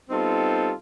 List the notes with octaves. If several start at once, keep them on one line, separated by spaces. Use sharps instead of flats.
G3 B3 C4 D#4 F4 A4